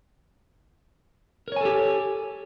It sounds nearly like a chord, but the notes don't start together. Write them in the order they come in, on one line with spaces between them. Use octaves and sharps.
A#4 C#5 G#5 A4 G4